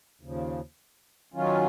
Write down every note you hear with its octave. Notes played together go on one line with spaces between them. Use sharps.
D#2 C#3 F3
D#3 F#3 C#4 F4